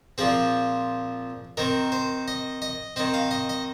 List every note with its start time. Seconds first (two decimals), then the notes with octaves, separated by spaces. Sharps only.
0.18 A#2 F3 C4 G#4
1.57 D#3 C4 A#4
1.92 C5
2.28 D#5
2.62 D#5
2.96 D#3 C4 D#5
3.14 F5
3.31 D#5
3.49 D#5